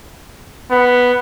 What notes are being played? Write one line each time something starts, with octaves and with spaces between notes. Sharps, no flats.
B3